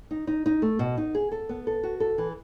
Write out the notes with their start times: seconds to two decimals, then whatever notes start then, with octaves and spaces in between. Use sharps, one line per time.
0.11 D#4
0.27 D#4
0.46 D#4
0.62 A3
0.79 B2
0.97 D#4
1.15 G#4
1.32 A4
1.49 B3
1.67 A4
1.83 F#4
2.00 A4
2.18 E3